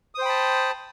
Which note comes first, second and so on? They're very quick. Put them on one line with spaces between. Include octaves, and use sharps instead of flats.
D#6 C5 G5 B5 A5